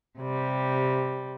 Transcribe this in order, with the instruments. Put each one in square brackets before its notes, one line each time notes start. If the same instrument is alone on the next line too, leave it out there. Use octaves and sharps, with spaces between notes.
[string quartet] C3 G3